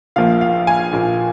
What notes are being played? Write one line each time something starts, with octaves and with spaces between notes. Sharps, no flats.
A#1 A#2 F3 A#3 F5
F5
G#5
A#1 A#2 F3 A#3